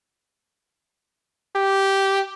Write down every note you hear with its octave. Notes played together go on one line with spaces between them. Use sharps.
G4